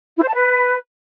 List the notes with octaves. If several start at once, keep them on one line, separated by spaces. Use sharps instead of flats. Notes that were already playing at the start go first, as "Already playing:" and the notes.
E4
C5
A5
B4